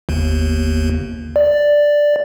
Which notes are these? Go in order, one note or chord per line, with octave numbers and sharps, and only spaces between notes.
G1 D#2
D5